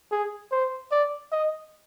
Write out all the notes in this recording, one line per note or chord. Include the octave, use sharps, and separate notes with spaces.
G#4
C5
D5
D#5